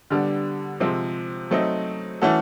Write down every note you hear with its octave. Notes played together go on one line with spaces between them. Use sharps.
D3 G3 B3 D4
C3 F3 G#3 C4
F#3 A3 C4 D#4
E3 A3 C#4 F#4 A4